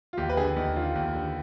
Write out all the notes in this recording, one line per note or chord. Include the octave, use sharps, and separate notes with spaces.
F4
D#2 G4
B4
D3 G#4
D#2 D#4
D3 F4
D#2
D3